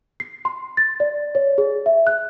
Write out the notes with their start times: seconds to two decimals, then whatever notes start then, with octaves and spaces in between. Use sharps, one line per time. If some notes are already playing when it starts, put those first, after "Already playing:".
0.20 C7
0.45 C6
0.77 A6
1.00 D5
1.35 C#5
1.58 G#4
1.86 E5
2.07 F#6